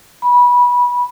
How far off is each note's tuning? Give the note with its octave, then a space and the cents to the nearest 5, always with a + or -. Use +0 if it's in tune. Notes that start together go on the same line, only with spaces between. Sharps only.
B5 -20